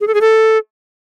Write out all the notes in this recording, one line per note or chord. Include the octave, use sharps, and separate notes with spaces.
G#4
A4
G#4
A4